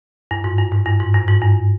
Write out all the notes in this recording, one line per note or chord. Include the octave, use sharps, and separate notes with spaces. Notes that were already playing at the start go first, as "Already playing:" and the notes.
G2
G#2
G2
G#2
G2
G#2
G2
G#2
G2